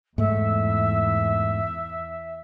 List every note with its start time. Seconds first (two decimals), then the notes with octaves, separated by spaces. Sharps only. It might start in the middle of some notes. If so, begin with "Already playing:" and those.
0.18 E2 G#2 A3 E5